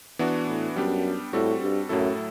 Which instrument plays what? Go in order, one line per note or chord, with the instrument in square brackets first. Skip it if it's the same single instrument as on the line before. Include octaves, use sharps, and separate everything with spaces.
[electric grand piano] E3 B3 D4 F#4
[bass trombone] A2
[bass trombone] F#2 [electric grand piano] G3 B3 D4 G4
[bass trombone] A2 [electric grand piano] G3 C4 F#4 A4
[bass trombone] G2
[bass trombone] F#2 [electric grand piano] A2 F#3 A3 E4 A4